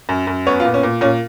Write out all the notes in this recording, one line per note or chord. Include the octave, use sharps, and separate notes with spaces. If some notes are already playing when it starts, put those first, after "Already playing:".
F#2
F#2
B3 C#5
F4
A#2
C#4
A#2
A#2 C#4